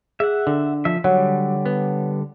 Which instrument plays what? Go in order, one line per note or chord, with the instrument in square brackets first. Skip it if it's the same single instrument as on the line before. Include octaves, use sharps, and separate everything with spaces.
[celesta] G#4 [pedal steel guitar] E5 F#5
[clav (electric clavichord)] D3 [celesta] D4
[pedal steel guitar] F3 E5
[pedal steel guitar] D3 G3 [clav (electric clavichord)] F#3 [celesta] C#5 F#5
[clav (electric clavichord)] B3